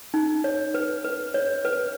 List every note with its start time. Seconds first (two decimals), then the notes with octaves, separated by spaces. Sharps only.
0.14 D#4
0.44 C#5
0.74 B4
1.05 B4
1.34 C#5
1.65 B4